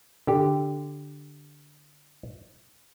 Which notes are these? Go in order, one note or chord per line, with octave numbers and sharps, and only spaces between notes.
D3 G4